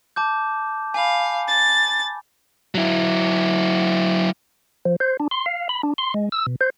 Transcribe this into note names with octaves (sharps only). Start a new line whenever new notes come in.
A5 D6 G6
F5 G#5 B5
A6
F#3 E4
F3
C5
D4
C6
F5
B5
D4
C6
G#3
E6
B2
C5